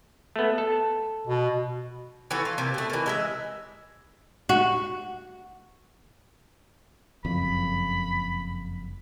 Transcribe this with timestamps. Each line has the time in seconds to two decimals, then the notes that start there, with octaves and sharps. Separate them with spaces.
0.36 A3 B3
0.58 A4
1.28 B2
2.31 E3 F#4 A4
2.45 F4
2.58 C3 A#3
2.74 B2 A3
2.90 E3 A#3
3.06 G#3 A4 E5
4.49 F#4
7.25 F#1 F2 B5